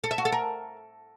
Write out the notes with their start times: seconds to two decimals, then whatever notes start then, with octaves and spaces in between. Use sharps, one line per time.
0.04 A4
0.11 E5
0.18 F#4
0.25 A4
0.32 A#4